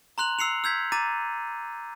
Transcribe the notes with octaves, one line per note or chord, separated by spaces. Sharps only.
A#5 C6 F#6 F7 F#7
E6 C7 C#7 F7
E6 G6 G#6 B6
A#5 D6 A6 D#7